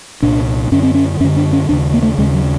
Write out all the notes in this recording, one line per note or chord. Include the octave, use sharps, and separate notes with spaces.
C2 A#2 D4
F#2 D3 C#4
C4
C#4
F#2 D3 C#4
D4
C#4
D#2 C#3 D4
A#3
A3
D#2 C#3 G#3
F#3